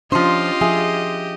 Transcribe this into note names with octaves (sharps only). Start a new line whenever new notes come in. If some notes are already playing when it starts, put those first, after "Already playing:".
F3 C#4 D4 F4 G4 C5 D#5
F3 G#4 E5